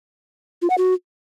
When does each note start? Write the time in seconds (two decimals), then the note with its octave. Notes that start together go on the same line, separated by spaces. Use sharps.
0.62 F4
0.70 F#5
0.78 F#4